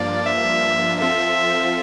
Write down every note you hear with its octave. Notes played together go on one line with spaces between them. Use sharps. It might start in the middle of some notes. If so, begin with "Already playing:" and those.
Already playing: G2 F3 A#3 D4 F4 D5
E5
F3 C4 F4 A4 E5